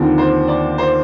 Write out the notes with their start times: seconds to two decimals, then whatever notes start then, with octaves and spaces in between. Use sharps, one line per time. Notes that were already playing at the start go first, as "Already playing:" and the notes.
Already playing: D#2 D3 F3 C4
0.18 C5
0.48 D5
0.78 C5